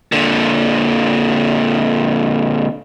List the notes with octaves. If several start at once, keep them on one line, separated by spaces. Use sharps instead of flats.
A#2 D3